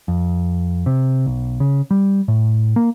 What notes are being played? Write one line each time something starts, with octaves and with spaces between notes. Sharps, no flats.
F2
C3
B1
C#3
G3
A2
A#3